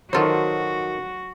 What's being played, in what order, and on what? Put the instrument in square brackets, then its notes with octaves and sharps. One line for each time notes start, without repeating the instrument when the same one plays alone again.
[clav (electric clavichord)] D#3 A4 C5 [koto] F#3 F4 [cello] F#4